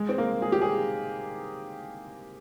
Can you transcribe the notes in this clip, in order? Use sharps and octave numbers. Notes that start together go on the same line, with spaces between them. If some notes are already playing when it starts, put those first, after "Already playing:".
Already playing: G#3
C4
A#3
G#4
G4
G#4